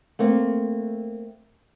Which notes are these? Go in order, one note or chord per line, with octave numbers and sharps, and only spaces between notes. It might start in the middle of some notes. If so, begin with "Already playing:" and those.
A3 A#3 C4